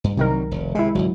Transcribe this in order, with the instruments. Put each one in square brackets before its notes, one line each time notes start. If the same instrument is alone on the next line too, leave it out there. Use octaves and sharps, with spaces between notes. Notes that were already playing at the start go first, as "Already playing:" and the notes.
[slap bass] G2
[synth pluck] C2 D#3 A#4 [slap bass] C3 F#3 G3
[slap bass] F1
[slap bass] C3 [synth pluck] G#3 E4
[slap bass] G#1 C#2 [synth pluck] F#3